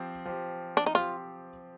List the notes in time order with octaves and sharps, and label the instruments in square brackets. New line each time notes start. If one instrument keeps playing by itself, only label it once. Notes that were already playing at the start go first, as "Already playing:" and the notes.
Already playing: [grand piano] F3 C4 G4
F3 C4 G4
[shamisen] D4
D#4
[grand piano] F3 C4 G4 [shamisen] F4